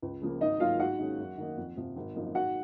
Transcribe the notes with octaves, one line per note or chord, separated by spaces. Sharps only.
C#2
C#3 F3 A#3
G#1 D#4 D#5
G#2 F#3 A#3 F4 F5
G#2 F#4 F#5
D#3 G#3 C#4
F#2
D#3 A#3 D#4
F2
C3 F3
G#1
F#2 F3 A#3 D#4
G#2 F#4 F#5